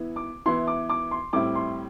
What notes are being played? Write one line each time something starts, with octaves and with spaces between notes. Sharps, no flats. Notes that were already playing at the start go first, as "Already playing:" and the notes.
Already playing: E3 B3 E4
D6
E3 B3 E4 C6
D6
D6
C6
A2 G3 C4 E4 D6
C6